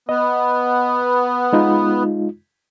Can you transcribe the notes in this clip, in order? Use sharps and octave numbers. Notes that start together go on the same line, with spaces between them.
B3 D#5
G#3 D#4 F4